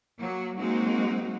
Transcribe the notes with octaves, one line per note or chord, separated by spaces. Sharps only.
F#3 A#3
F#3 G#3 A#3 C4 D#4 F#4